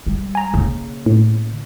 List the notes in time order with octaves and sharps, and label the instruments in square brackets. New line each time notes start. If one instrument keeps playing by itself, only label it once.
[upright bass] G3
[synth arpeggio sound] G#5 A#5
[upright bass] C#3 A#3
[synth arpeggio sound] A2